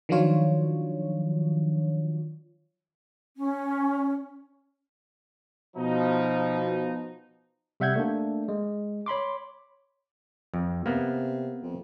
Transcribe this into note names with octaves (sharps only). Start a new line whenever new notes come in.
D#3 F3 F#3 D4 F4 C#5
C#4
B2 F3 D#4
C3 G3 E5 F#5 G6 G#6
A3 A#3 D4
G#3
C#5 B5 C6 D6
F2
C3 A#3 B3
F2